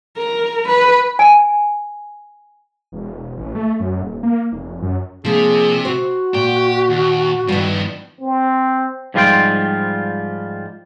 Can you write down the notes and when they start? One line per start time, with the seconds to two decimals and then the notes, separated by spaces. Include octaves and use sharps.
0.17 A#4
0.69 B4
1.19 G#5
2.92 E1
3.37 A1
3.55 A3
3.80 F#2
4.02 D#1
4.23 A#3
4.52 F1
4.82 F#2
5.25 C3 F3 A#3 D4 G#4
5.85 F#4 C5
6.34 A#2 G4
6.89 D#2
7.48 G2 D#3 F3 B3
8.20 C4
9.14 G#2 F3 G3 F4 C5 G5